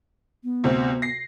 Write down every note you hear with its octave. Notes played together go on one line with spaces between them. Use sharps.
B3
D2 C3 C4
A#6 C7